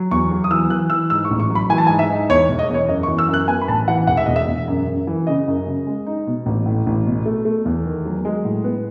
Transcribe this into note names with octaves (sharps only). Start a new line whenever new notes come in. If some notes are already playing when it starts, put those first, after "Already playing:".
Already playing: F#3
E2 C#6
F#3
D#6
E3 E6
E3 F#6
E3 E6
G#2 E6
C#6
A1
C#6
F#3
B5
E3 G#5
A5
G#2 G#5
E5
D#4
E2 C#5
E1
D#5
E2 C#5
F#2 D#5
C#6
E3
E6
F#2
F#6
B3 G#5
B5
A1 A5
E3 F#5
E1 F#5
E5
E1 D#5
E5
E1
F#2
F#2
E3
C#3 D#5
F#2
C#3
G#3
D#4
B2
A1
A2
A1
B2
A3
A3
E2
D#3
F#3
G#3
A2
B3